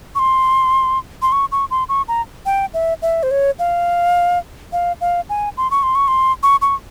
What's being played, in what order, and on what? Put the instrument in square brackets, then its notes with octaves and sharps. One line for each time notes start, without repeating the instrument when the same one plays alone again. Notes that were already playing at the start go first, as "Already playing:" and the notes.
[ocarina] C#6
C6
C6
C#6
C#6
C6
C#6
A#5
G5
E5
E5
C5
C#5
F5
F5
F5
G#5
C6
C#6
C6
C#6
C6
C#6
C#6